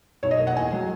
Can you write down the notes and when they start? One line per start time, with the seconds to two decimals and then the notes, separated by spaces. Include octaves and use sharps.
0.23 B1 C#5
0.31 D#5
0.39 A#3
0.47 F#5
0.56 E2 G#5
0.72 F#3